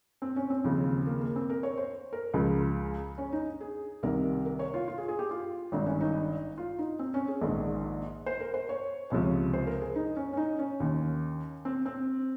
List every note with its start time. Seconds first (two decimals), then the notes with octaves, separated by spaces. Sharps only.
0.22 C4
0.36 C#4
0.50 C4
0.64 D#2 C#3 F3
1.07 A#3
1.21 A#3
1.36 C4
1.50 A#4
1.63 C#5
1.78 C5
2.13 A#4
2.34 C#2 C#3 F3 G#4
3.18 C#4
3.33 D#4
3.61 G#4
4.03 C2 C3 D#3 A#4
4.46 A#4
4.59 C#5
4.74 F4
4.88 F4
4.98 G#4
5.08 G#4
5.19 G4
5.31 F4
5.72 G#1 G2 D#3 D#4
5.86 C#4
6.01 D#4
6.58 F4
6.79 D#4
6.99 C4
7.14 C#4
7.28 G#4
7.42 A#1 G#2 D#3
8.26 C5
8.40 A#4
8.54 C5
8.69 C#5
9.10 C#2 C3 F3 C#5
9.53 C5
9.67 A#4
9.81 G#4
9.96 D#4
10.16 C#4
10.33 C#4
10.37 D#4
10.59 C#4
10.80 D#2 D#3
11.65 C4
11.86 C4